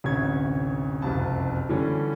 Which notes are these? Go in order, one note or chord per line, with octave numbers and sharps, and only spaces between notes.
A1 D2 C3 C#5 G#6
F#1 C2 F2 A5
D3 E3 G3 C#4 A4